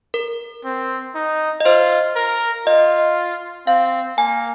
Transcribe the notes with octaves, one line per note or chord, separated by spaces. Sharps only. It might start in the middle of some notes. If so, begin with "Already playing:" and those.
A#4
C4
D#4
D#5
F4 C5
A#4
F4 D#5
C4 F5
A#3 G#5